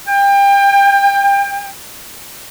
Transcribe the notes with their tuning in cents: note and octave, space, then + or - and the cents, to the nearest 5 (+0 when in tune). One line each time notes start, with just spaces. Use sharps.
G5 +30